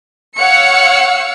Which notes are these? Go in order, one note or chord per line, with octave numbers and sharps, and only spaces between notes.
C#5 F5 F#5 E6 C#7